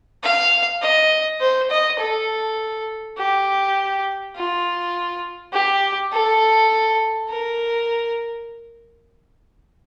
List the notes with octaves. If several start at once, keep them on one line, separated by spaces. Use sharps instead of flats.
F5
D#5
C5
D#5
A4
G4
F4
G4
A4
A#4